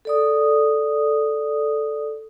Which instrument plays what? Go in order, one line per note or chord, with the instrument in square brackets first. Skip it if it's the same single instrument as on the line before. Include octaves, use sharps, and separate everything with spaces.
[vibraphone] A4 D5 D#6